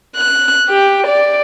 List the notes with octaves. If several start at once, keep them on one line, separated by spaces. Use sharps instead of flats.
F#6
G4
D5